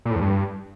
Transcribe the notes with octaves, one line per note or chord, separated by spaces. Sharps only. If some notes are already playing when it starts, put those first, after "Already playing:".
A#2
A2
E2
G2